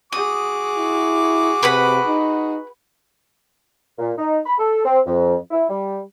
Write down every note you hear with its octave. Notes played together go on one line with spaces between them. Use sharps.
F#4 G#4 D6 D#6
E4
C3 B4 F#5 B5
D#4
A#2
D#4
B5
A4
C4
F2
E4
G3